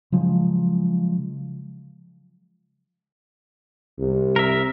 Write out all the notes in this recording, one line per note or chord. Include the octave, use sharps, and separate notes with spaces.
C#3 F3 F#3 G#3
C2
A#4 E5